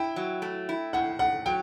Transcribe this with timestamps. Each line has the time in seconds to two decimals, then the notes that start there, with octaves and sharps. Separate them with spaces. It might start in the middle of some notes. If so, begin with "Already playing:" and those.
Already playing: E4 G5
0.16 F#3
0.42 A3
0.69 E4
0.93 A2 F#5
1.19 A2 F#5
1.46 F#3 G5